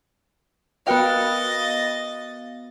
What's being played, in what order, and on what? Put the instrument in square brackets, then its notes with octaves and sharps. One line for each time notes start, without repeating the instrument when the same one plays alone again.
[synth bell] B3 F#4 F5 [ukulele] A#4 B4 G5 [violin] D#5 A6